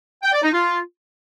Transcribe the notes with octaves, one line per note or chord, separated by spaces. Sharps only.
G5
D5
D#4
F4